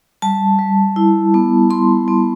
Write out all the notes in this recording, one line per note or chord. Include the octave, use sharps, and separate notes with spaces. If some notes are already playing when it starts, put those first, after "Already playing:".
G3 A5
G3
E4
B3
B3 C6
B3